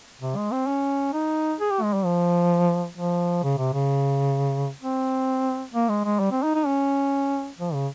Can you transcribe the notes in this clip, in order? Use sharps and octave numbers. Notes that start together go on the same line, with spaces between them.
C3
G#3
C4
C#4
D#4
G#4
G4
G#3
G3
F3
F3
C#3
C3
C#3
C4
A#3
G#3
G#3
G3
C4
D#4
D#4
C#4
F3
C#3